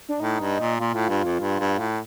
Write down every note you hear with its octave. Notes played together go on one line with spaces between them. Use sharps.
D4
A2 D#4
G2
A#2
A#2 F4
A2
G2
F2
G2
G2
A2